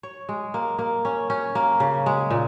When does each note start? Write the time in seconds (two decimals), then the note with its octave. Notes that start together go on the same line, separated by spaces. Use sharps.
0.03 C#5
0.29 G#3
0.54 A#3
0.79 A#3
1.05 C#4
1.30 C#4
1.55 A#3
1.80 C#3
2.06 G#3
2.31 A#2